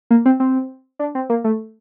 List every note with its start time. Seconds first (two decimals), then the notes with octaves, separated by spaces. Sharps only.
0.11 A#3
0.25 C4
0.40 C4
0.99 D4
1.15 C4
1.30 A#3
1.44 A3